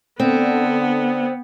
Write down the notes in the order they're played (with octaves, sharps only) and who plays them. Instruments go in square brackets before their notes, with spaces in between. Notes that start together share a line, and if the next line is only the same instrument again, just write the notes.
[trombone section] D3 [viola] B3 [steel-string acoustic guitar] C4